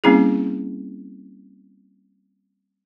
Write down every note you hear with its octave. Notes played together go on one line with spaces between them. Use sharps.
G3 A#3 C4 C#4 E4 G#4